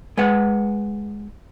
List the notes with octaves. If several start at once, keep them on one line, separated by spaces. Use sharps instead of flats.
G#3 B4 F#5